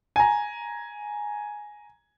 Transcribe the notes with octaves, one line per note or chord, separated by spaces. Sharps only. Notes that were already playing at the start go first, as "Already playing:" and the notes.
G#5 A#5